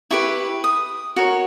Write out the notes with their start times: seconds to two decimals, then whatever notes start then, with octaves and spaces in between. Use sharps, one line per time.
0.11 E4 G4 B4 C#6
0.64 D#6
1.16 F#4 A#4 C#5